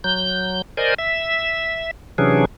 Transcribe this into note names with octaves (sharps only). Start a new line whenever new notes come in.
F#3 G6
A#4 C5 D5 D#5 G#5
E5
C3 E3 F#3 C#4 D4 G#4